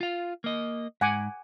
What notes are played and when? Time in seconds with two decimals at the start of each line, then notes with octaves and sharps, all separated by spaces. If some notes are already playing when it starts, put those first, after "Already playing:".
0.01 F4 F5
0.44 A#3 D#5
1.01 G#2 F#5 G#5 D6